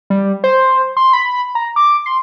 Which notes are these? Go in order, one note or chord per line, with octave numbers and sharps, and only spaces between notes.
G3
C5
C6
B5
A#5
D6
C6